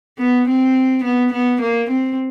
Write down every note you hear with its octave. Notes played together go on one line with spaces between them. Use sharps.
B3
C4
B3
B3
A#3
C4